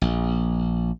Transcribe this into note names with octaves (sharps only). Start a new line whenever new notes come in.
A#1